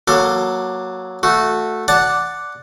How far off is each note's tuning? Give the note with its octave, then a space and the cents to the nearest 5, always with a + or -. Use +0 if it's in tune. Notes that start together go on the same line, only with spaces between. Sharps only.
F#3 +0 A#3 +20 A4 +25
A3 +0 F#4 -15
D5 +0 F#5 +0 A5 +5